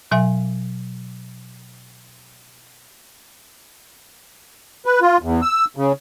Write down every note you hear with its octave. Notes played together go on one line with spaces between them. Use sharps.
B2 F#3 E5 G#5
B4
F4
E2
E6
C#3